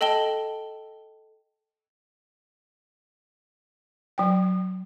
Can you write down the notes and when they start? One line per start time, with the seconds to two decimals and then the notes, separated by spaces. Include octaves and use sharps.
0.01 A4 D#5 G5 A5 G7
4.18 F#3 G5